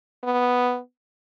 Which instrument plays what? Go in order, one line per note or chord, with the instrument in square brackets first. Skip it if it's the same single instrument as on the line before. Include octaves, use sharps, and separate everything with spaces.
[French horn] B3